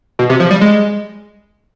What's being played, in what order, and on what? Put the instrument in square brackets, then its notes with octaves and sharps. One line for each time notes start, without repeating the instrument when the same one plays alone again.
[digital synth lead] B2
C3
F3
G3
G#3